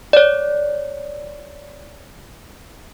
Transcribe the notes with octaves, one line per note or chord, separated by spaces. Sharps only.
C#5 D5